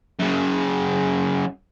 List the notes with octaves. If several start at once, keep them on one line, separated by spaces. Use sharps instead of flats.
F#2 C#3